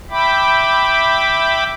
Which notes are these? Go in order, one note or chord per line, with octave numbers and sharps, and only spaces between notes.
E5 G5 B5 D6